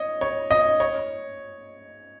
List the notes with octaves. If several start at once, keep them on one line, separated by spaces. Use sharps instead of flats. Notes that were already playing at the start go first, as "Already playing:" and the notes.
Already playing: C#5 D#5
C#5
D#5
C#5